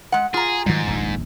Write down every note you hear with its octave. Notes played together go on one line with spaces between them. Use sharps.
G#3 F#5
F4 G#4 A#5
G#2 D#3 F#3 G3
D#1 A#1 F2